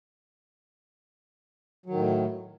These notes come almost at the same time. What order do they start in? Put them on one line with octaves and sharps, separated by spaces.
F#3 D#3 A2